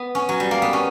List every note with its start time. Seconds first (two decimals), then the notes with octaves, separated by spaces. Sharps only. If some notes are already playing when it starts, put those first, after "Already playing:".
Already playing: B3
0.15 C#4
0.29 F#3
0.40 G3
0.51 A#3
0.62 B3
0.73 C#4